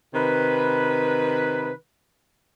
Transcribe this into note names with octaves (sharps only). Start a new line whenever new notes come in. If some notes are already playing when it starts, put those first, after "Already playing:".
C3 D#3 B4